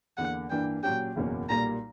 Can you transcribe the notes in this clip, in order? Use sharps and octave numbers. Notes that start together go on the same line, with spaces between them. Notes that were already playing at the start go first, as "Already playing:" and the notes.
E2 D3 A#3 F#5
G2 E3 A#3 D4 G5
A#2 F#3 C#4 G4 G5
F#1 E2 B2 A#3 C#4
B1 A#2 G3 A#3 A#5